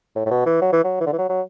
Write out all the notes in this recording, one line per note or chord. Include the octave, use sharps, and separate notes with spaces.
A2
A2
B2
E3
F#3
E3
F#3
E3
D3
E3
F#3
F#3